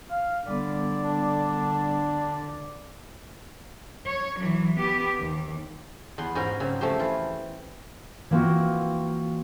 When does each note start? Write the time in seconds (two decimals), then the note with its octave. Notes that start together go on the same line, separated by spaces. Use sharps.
0.11 F5
0.47 D3 G3 B3 D5
1.03 D4
4.06 C#5
4.40 E3 F#3
4.78 B3 G4
5.19 D#2
6.18 E2 B3 C6
6.35 G#2 C#4 F4 G4 A#4 G#5
6.60 C#3 F#3 A#3 C4
6.81 F3 A3 C#4 G4 C5
6.99 E3 F4
8.30 E3 A#3 C4 F4 F#4